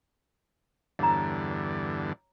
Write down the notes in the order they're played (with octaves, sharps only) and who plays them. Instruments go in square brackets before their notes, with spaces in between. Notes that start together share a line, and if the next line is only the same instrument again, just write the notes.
[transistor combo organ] E2 G2 D3 [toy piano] C#5 A#5